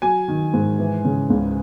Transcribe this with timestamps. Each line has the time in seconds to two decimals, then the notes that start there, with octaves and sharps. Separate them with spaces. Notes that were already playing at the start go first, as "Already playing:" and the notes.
0.02 F#3 G#5
0.28 D#3
0.53 G#2
0.79 E3
1.05 C#3
1.30 C#2